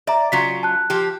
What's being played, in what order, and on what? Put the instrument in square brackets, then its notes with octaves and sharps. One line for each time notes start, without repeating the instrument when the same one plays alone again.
[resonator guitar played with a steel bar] D5 [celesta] E5 A#5
[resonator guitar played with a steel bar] C#3 F#3 F4 [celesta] B6
[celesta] A5 F#6
[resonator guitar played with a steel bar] F3 G4